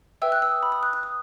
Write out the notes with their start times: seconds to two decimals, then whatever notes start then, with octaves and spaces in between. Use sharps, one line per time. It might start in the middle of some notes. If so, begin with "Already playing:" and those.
0.22 B4 E5 G5 E6
0.32 F#6
0.42 E6
0.52 D#6
0.63 B5
0.72 D#6
0.83 F#6
0.93 F#6
1.03 D#6